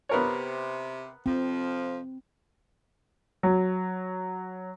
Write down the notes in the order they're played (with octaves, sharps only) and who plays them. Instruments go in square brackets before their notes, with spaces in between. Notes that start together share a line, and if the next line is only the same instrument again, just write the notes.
[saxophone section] C3 [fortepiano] B3 A#4 C#5
[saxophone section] F2 F3 [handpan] C4
[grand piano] F#3